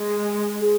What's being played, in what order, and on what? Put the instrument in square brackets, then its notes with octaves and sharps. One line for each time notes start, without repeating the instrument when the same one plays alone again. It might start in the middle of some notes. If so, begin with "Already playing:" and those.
Already playing: [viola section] G#3
[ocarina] G#4